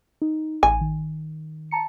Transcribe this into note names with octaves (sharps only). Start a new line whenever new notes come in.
D#4
A1 G#5
D#3
A5 A#5 C#7